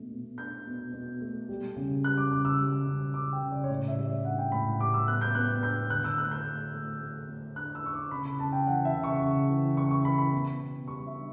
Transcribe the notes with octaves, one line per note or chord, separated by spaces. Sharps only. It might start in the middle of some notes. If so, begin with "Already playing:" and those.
Already playing: B2 A3 D4
B2
D4 G6
B2
B2
A3
G3
C#3
G3 F#6
D6
C#3 D6
E6
G3
C#3
C#3 D6
G5
C#3
D5
C#5
A2 D5
E5
G3
D5
D4 F#5
G5
A2 B5
G3 D6
E6
B3 F#6
G6
B3 F#6
D4 G6
D3 F#6
E6
A3 F#6
G6
A3
A3
A3
A3
D4 F#6
E6
D4 C#6
D6
C#3 B5
B5
C#3 A5
G5
E3 F#5
E5
C#3
C#6
C#3
E3
C#3 C#6
C#6
E3 B5
B5
B3
B2
G3 C#6
E5
D4